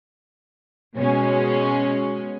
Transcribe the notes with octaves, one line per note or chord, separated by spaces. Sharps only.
B2 G#3 C#4